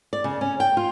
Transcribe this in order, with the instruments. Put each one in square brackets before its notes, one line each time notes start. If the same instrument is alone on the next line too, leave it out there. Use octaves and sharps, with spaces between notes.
[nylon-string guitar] D5
C#3
C#4
G5
F4